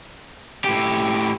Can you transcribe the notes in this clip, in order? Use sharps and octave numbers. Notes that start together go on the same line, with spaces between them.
A2 G4